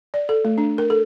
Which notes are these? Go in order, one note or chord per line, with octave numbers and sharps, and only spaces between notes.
D5
A4
A3
D4
A#4
A4